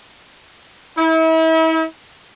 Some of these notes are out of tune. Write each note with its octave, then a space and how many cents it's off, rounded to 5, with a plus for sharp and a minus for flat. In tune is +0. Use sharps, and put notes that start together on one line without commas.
E4 -40